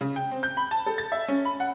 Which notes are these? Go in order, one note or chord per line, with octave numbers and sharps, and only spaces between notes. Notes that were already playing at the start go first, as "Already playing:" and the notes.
C#3
G5
C4
G6
B5
A5
A4
A6
E5
C#4
B5
F#5